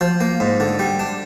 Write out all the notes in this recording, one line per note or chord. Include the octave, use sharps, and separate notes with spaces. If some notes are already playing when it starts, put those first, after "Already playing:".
F3
A#3
G#2
D3
G3
D4